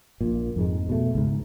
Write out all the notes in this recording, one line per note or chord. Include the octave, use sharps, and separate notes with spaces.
A#1 A#2
F2 G#2 G#3
B2 A3
C#2 G#2